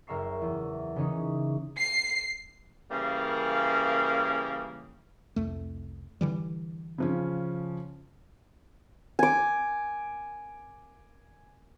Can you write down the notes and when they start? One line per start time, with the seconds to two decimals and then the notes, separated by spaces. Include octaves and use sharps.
0.07 F#1 A#4 E5 C#6 C7
0.42 E2
0.96 C#3 E3 C#4 D#4
1.77 C7
2.90 C#3 E3 G3 A#3
5.36 C2 F2 A3
6.21 D3 E3 G3
6.98 C#3 F3 C#4
9.19 G#5 D6